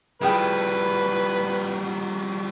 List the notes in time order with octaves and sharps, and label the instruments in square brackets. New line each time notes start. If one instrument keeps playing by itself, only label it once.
[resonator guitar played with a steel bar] A2 G#4 G5 [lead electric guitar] F3 G3 [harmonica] B4